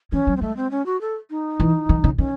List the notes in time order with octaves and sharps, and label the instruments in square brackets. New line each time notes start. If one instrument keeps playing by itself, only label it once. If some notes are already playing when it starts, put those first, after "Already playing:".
[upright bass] E3 [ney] C#4
[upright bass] F#3
[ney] C4
[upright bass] G#3 [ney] A3
[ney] C4
C#4
F#4
A4
D#4
[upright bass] E3
D#3
C#3
[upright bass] D#3 [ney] C#4